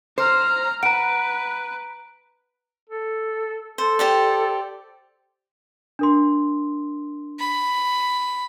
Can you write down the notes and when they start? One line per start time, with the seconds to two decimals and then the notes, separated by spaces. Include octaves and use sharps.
0.18 C5 A#5 F6
0.83 B4 F#5 A#5 D7
2.90 A4
3.78 A4 C5
3.99 G4 C5 D5
5.99 D4 A#4 C6
7.40 B5